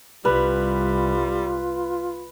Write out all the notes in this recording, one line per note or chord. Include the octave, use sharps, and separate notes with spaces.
C2 G3 F4 B4